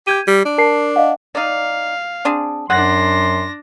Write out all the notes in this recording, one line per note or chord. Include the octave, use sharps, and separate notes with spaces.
G4 G6 G#6 D#7
G3
D4
A#4 A5 C7
D#5 F5 F#5
D#4 D5 F5
C4 D4 G#4
F#2 F#3 D4 F#5 C6 A#6